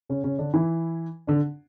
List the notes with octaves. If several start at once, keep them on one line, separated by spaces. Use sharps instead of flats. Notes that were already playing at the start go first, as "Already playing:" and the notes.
C#3 C#4
C#3 C#4
D3 D4
E3 E4
D3 D4